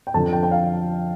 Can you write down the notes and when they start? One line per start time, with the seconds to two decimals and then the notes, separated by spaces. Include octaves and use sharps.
0.07 G5
0.14 F2 D3 F3 A4 A5
0.33 G5
0.43 G5
0.51 F5